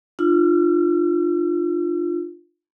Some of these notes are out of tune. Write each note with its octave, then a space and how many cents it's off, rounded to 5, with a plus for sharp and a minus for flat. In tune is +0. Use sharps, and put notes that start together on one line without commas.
D4 +45 F4 +0 E6 +45